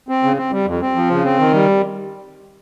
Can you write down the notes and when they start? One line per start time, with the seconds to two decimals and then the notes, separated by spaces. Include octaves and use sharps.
0.09 C4
0.23 C#3
0.37 C4
0.51 G3
0.66 F2
0.81 C4
0.96 F3
1.10 C#3
1.25 C4
1.39 D#3
1.54 G3